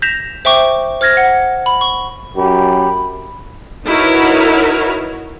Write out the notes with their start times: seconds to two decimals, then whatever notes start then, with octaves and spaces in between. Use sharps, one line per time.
0.02 G6 A#6 B6 E7 F7
0.45 C5 E5 G5 C#6 D6
1.01 C5 F6 G#6 A#6
1.17 F#5
1.66 B5
1.81 C#6
2.37 F#2 G4 B5
3.86 D#4 E4 F#4 A#4 B4 C#5